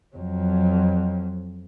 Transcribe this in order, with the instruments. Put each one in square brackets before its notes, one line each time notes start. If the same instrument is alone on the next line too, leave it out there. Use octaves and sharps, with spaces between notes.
[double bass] F2 F#3